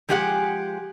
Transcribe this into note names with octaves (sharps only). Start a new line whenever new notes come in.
F3 G#3 G4 G#4 A#4 F#5